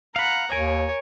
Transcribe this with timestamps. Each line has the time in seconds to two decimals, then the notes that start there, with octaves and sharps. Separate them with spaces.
0.16 F5 F#5 A#5 B5
0.52 D#2 A#4 C#5 G#5